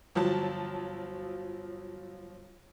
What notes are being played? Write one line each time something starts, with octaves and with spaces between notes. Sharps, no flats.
G1 F3 F#3 A5